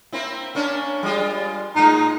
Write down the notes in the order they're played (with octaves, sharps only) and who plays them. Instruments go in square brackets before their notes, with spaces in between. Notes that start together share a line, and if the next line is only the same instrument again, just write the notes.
[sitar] A#3 C4 E4
A#3 C#4 D4
G3 G#3 F4
[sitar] A2 G#3 [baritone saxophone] D#4